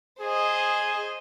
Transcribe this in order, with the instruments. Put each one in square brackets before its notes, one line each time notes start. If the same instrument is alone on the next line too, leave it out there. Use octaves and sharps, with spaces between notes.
[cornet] G#4 [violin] C5 D#5